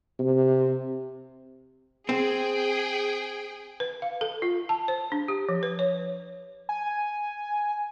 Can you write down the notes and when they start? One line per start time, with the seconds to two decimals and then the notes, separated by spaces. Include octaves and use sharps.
0.19 C3
2.09 C4 G#4 G5
3.80 B4
4.02 F5
4.21 A4
4.42 F4
4.69 A5
4.88 C5
5.12 D4
5.28 G4
5.49 F3
5.63 B4
5.79 C#5
6.69 G#5